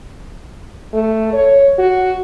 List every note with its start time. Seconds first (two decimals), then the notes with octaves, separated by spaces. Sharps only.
0.93 A3
1.33 C#5
1.79 F#4